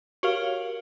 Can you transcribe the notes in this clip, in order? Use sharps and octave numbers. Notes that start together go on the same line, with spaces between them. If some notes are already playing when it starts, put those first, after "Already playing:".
F#4 G4 A#4 C#5 F5